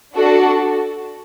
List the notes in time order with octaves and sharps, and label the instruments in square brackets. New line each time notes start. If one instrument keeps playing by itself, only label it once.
[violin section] D4 F#4 A4